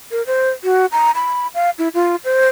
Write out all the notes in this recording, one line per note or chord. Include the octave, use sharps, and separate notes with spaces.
A#4
C5
F#4
A#5
B5
F5
E4
F4
C5